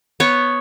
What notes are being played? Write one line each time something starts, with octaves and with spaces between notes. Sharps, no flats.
B3 C#5